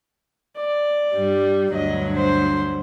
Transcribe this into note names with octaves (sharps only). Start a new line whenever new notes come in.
D5
G2 G3
D2 G2 F#3 D#5
C5